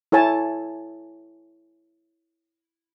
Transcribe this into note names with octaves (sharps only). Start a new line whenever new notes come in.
E4 A4 C#5 G#5 A5